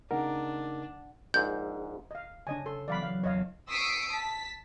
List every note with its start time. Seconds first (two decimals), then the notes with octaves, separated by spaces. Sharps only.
0.11 C#3 A#3 D4 D#4 A#4 F#5
1.34 A#1 G#2 G6
2.11 D#5 F5
2.47 C#3 D4 D#5 G#5
2.66 A4 C6
2.88 E3 F#3 B3 D5 F5 B5
3.03 F5
3.24 A#1 E2 C#5 D#5 F5
3.70 C#6 D#6 E6 B6 C7 D7
4.11 A5 B6